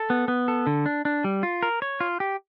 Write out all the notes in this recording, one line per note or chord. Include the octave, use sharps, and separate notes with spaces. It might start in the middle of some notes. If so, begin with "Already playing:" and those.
Already playing: A4
B3
B3
A4
D3
D4
D4
G3
F4
A#4
C#5
F4
G4